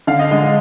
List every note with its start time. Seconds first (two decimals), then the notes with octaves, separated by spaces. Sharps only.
0.07 D3 F5
0.19 D#5
0.31 G#3 D#5
0.43 D#5